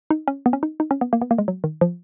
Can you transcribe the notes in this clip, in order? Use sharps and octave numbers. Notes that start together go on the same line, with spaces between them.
D#4
C#4
B3
C#4
D#4
D#4
C#4
B3
A#3
B3
A#3
G#3
F#3
D#3
F3